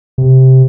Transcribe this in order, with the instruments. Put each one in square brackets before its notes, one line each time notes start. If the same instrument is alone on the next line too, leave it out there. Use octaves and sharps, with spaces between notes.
[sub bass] C3